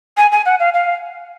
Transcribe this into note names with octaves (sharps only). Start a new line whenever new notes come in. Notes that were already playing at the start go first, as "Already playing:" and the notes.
G#5
G#5
F#5
F5
F5